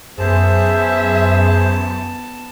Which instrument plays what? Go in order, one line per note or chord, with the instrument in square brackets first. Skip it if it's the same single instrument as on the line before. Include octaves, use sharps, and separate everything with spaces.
[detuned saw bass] F#2 [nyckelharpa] B3 A5 [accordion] G#4 C5 [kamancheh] E5